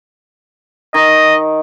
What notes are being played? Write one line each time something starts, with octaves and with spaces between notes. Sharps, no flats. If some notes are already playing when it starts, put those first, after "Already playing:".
D#3 D#5